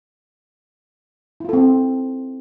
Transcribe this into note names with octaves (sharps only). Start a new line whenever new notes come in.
C4 E4 F4 A4